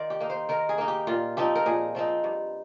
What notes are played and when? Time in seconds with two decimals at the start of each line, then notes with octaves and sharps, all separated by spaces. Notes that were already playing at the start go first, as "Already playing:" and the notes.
Already playing: D#3 F4 C5 D5
0.10 G4
0.20 A#3 D#4
0.30 C5
0.49 D#3 A#4
0.69 G#4
0.78 A#3 D#4
0.88 G4
1.07 A#2 F4
1.37 F3 C4 D#4 G4
1.55 A#4
1.66 A#2 G#4
1.95 F3 C4 D#4
2.24 G2